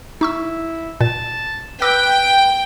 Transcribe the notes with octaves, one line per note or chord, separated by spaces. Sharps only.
D#4 E4 C#6 E6
A#2 A5
B4 G5 D6 E6 A#6